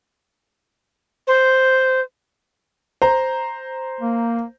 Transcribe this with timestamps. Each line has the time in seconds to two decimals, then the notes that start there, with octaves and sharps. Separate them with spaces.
1.27 C5
3.02 C5 A#5
4.01 A#3